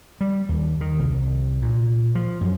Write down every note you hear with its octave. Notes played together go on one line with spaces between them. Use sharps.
G3
D#2
D#3
C2
A#2
F3
F#2